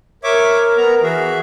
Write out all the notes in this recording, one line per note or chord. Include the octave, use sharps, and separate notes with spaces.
A#4 C#5 E5 D6
B3 A#5
E3 F#4 G#4 E5